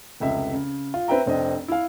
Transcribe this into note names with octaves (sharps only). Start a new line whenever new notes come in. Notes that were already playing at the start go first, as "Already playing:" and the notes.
F1 C#2 E5
C#3
F4
C4 B4 E5 G5 A#5
F1 C4 D4 D#5
E4 F5